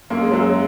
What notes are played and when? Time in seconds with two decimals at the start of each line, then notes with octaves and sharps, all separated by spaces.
0.10 F#2 A#3
0.21 G#3
0.31 F#2 F#3
0.41 G#3